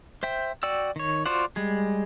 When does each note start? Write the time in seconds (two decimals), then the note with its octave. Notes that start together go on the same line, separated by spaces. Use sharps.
0.23 C5 E5 G5
0.63 F#4 D5 G5 E6
0.96 D#3 C#5
1.26 F4 F#4 C5 D5 F#5
1.56 G3 G#3 G#4